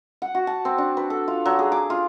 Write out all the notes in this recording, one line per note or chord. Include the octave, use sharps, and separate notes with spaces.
F#5
F#4
A5
C4
D4
B4
A4
F4
F#3
G#4
D6
F4